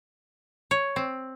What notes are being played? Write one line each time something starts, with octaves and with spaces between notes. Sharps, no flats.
C#5
C4